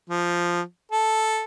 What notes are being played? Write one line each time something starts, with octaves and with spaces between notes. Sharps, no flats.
F3
A4